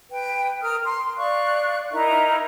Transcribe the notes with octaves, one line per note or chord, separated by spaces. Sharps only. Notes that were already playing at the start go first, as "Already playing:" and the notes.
B4 G5
A#4 D#6 F6
C6
D5 F5 C#6 F#6
D#4 E4 A#4 E5